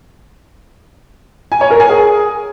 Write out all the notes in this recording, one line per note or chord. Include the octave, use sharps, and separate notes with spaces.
G#5
C#5
A#4
G#5
G#4